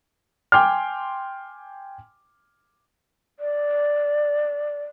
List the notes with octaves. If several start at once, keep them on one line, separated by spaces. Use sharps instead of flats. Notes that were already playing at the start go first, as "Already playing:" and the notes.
G5 G#5 C6 D6 F6
D5